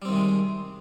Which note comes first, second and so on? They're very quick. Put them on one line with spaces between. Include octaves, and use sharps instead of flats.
G3 C4 D#3 C3 G#3